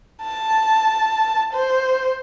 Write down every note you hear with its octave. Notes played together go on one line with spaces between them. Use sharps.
A5
C5